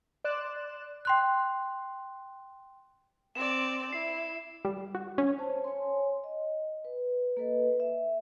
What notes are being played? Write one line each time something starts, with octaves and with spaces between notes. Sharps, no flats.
D5 C6 F#6 E7
G5 C6 F#6
C4 D5 E7
E4 C7
G3
F#4
C#4
C5 C#5 A5
C#5 G#5 C6
D#5
B4
A#3 A4 B4 D#5
E5